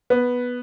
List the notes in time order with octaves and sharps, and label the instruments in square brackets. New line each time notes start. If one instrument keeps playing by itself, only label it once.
[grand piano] B3